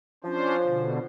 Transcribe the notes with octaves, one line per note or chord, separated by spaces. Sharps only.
F3 C#4 D4 C5
B2 D3